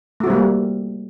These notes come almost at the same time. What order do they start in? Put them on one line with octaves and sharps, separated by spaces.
A3 F#4 C4 G3 A#3